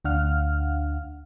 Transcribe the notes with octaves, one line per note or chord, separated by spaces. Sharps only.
D2 D4 F5 F#5 F6